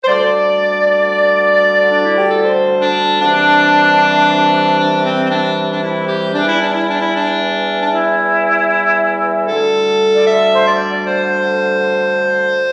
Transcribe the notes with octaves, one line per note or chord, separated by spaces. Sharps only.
C5
D2 D3 G3 D5
D4
E4
G4
A4
C5
D4
C2 C3 E3 G3 D4
D4
C4
C4
D4
D4
E4
G4
E2 E3 G3 D4
E4
D4
E4
D4
E4
D4
D4
E4
D2 D3 G3 A4
D5
E5
C5
D5
D5
C5